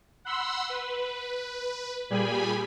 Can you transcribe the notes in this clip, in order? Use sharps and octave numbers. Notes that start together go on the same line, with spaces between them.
F#5 B5 C6 E6
B4
A#2 G3 G4 G#4 G#5 B5